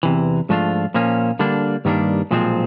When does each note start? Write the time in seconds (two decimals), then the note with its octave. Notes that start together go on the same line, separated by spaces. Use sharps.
0.03 E2 C3 E3
0.49 G#2 F3 A3 D4 F4
0.94 A#2 F3 A#3 C#4
1.39 D3 G3 A#3 D4
1.85 G2 D#3 G3 A#3 D4
2.31 B1 A#2 F3 G#3 C4